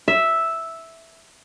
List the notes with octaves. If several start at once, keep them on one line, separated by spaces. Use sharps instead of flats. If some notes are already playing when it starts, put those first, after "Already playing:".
E5